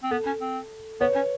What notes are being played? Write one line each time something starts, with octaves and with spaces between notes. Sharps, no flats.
C4
B3 A4
C#4
C4
B3 B4 C#5
C#4